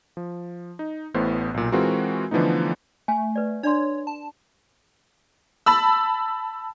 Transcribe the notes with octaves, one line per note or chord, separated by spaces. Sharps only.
F3
D#4
A1 A2 B3 C5
B1 A#2
E3 G#3 C4 F4 F#4 A#4
D3 E3 F3 A3 B3 D#4
A3 G#5
B4 D5
D4 C#5 D5 C6
A5
A5 B5 E6